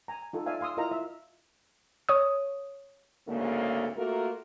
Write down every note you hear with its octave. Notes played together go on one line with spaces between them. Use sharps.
G#5 A#5
D#4 F4 A4
D5 E5 F5 G#5
F5 C6 D#6 E6
E4 F4 A#4 D#5 F5 A#5
E5
C#5 D#6
D2 G#2 C#3 A#3 C4 A4
A3 A#3 F4 F#4 A4 A#4